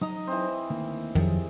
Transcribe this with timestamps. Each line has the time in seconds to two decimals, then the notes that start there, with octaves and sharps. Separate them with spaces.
0.01 F#3 D#4 D#5 A#5
0.27 E3 C4
0.70 D2 D#3 A#3
1.15 F2 D#3 F3 F#3 G4 G#4